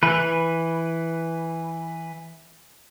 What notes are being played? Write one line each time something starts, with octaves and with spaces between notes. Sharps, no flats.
E3 B4